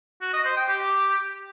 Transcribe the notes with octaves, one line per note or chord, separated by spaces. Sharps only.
F#4
D#5
C5
G5
G4